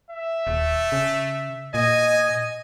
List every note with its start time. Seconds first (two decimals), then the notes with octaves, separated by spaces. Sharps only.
0.11 E5
0.47 D#1 A3
0.92 C#3
1.74 A#2 D#5 G#5